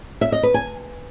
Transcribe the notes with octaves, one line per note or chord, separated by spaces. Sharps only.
E5
D#5
B4
G#5